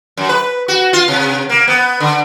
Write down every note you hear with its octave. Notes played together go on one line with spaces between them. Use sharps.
F#2
B4
F#4
F4
C3
A#3
B3
D3